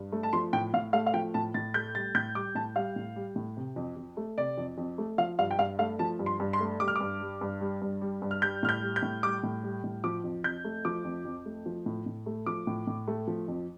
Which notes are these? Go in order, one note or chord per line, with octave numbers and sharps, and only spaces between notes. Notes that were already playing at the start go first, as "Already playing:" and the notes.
Already playing: G2
A3
A5
F3 C6
A2 G5
A2 F5
A3 F5
F5
F3 G5
A2 A5
A2 A6
A3 G6
G3 A6
A2 G6
G3 D6
A2 A5
G3 F5
A2
G3
A2
C3
F2
F2
A3
C3 D5
F2
F2
A3
F3 F5
G2 F5
G5
G2 F5
A3 F5
F3 A5
G2
C6
G2
C6
A3
G3 D6
F6
G2 D6
G3
G2
G3
G2
G3
G2
F6
G3 G6
A2 F6
G6
G3
G6
A2
G3 D6
A2
G3
A2
F3 D6
F2
F2 G6
A3
F3 D6
F2
F2
A3
F3
A2
A2
A3
F3 D6
A2
A2
A3
F3
F2